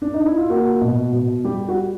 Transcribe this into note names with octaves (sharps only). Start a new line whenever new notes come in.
D4
D#4
E4
F4
A#3 F#4
B2
B2
G3 G4
F#4